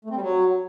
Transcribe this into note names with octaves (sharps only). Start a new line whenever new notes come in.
A3
C4
G3
F#3